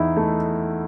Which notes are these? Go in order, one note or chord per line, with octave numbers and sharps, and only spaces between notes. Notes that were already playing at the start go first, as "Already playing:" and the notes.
Already playing: E2 D#4 E4
A3